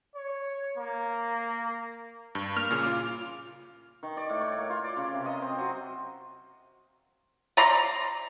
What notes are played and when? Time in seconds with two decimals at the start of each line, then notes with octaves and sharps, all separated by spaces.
0.15 C#5
0.77 A#3
2.35 G2
2.57 A#3 F6
2.71 A#2 C#3
2.83 F4 D6
4.03 D#3
4.17 D5
4.29 A2
4.41 C#5
4.58 A#3
4.70 F4
4.84 D5
4.97 C#3
5.13 C3
5.26 D#5
5.42 C4
5.58 F#3
7.57 D5 A#5 C6